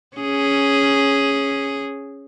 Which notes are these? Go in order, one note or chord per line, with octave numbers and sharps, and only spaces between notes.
C#4 G#4